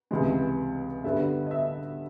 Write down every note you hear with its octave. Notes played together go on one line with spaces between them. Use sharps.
C#2 C3 E3 G#3
G2 D3 G3 B3 E5
D#5
E5